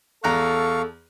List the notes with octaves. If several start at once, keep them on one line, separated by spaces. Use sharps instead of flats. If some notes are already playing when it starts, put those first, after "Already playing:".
E2 A4 F5 A#5 C#6 F#6